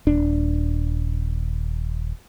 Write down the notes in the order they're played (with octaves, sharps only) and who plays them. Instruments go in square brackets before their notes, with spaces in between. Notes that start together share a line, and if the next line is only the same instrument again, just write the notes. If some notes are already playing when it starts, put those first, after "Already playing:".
[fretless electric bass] D#1 D4